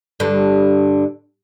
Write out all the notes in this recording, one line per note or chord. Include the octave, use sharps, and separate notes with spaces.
G2 D3